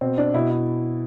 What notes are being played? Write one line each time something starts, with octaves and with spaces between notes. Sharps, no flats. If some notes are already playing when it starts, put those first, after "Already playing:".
B2 C4
D4
B2 E4
E4